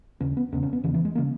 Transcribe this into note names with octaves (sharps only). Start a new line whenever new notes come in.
D#2 C#3 C#4
B3
E2 C#3 C#4
C#4
B3
E2 C#3 E3
E3
G#3
C#3 A#3